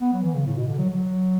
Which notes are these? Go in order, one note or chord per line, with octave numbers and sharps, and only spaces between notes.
B3
F#3
E3
C#3
A2
B2
D3
F#3
F#3